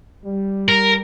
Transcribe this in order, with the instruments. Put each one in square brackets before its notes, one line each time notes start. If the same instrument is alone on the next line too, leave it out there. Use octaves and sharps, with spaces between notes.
[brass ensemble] G3
[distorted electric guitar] A#4